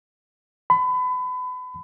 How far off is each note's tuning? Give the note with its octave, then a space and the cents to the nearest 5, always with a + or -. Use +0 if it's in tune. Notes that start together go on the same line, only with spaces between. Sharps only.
B5 +30